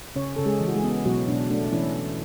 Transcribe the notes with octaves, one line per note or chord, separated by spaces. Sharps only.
C#3 C#4 C#5
C#3 A4
G#3 G#4
E3
F#4
G#3 G#4
B3
B2 F#3 F#4
B2 D4
A3 D4
E3 C#4 E4